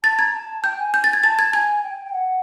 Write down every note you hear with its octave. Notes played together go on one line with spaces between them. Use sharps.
A5 A6
A#5 G#6
A5
G5 G6
G#5
G6
A6
G#6
A5 A6
G#6
G#5 G#6
G5
G5
F#5